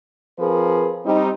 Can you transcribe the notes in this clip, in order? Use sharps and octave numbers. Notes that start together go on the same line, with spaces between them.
F3 C4 G#4 A#4 B4
G3 C4 D#4